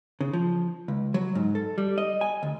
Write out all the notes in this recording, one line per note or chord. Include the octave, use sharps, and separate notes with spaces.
C#3
F3
C#2
F#3
G#2
A4
G3
D#5
G#5
D2